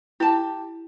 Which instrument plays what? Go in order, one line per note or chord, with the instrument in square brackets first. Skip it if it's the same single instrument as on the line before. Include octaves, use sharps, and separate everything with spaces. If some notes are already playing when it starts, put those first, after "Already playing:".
[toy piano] E4 [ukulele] G4 A5